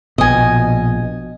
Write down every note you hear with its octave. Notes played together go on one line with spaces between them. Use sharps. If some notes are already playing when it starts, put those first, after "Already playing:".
A#1 B2 D#5 G#5